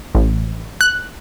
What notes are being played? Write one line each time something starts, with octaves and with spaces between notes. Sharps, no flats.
A1
F#6